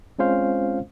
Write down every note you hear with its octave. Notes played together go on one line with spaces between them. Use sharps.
G#3 C4 C#4 F4 C5 F5